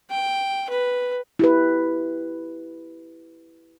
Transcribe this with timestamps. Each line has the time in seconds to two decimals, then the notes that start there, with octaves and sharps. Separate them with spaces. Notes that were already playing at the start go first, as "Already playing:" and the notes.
0.10 G5
0.70 B4
1.39 E4 G4 B4